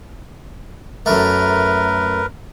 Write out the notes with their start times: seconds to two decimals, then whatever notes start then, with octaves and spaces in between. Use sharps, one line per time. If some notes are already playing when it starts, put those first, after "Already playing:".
1.06 F#2 A3 A#4 B4